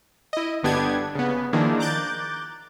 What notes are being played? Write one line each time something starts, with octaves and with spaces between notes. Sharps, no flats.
E4 D#5
G1 D3 B3 D4 G4 G#6
C#3 B3
D#3 F3 A#3 D4 E4 G#4
A#5 D6 F#6 G6 A6